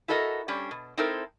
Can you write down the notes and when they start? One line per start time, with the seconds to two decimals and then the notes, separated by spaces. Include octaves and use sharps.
0.08 E4 F#4 A4 A#4 D#5
0.48 G3 C#4 D4
0.71 B2
0.97 C4 D#4 E4 A4 A#4 C5